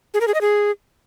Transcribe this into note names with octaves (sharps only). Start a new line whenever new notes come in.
G#4
A#4
G#4
D#5
G#4